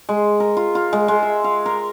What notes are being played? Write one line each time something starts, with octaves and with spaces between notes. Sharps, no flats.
G#3
A#4
F4
F4
G#3
G#3
E5
F5
A#4